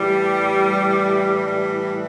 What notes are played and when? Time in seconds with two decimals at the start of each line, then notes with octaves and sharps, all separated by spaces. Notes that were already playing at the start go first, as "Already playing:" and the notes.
Already playing: A2 E3 G3
1.46 G3